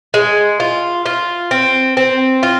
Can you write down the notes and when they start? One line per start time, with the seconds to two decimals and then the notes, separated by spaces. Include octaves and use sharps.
0.14 G#3
0.60 F4
1.06 F4
1.51 C4
1.97 C4
2.43 F4